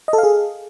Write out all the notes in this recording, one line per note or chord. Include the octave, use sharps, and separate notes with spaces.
D#5
A4
F5
G#4